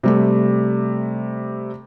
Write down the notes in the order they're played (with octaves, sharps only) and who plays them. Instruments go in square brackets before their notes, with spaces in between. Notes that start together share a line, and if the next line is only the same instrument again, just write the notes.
[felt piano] C3 G3 A3